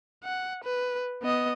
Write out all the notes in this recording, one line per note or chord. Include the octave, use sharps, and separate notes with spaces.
F#5
B4
B3 D#5